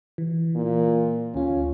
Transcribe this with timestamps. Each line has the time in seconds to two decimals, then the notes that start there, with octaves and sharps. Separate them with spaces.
0.18 E3
0.56 A#2
1.34 D2 C#4 F4